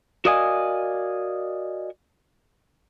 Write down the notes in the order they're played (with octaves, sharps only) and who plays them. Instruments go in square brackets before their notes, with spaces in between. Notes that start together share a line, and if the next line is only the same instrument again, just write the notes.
[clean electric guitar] F#4 A#4 D5 D#5 F5 G#5